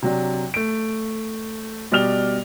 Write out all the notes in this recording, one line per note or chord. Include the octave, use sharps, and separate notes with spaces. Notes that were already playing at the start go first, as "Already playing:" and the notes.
C3 F#3 D4
A3 D7
B2 G3 D5 F6 F7 G7